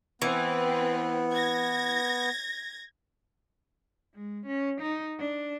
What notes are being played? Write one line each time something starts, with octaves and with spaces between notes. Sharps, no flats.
E3 B3 C4 B4
G#6 A#6
G#3
C#4
D#4
D4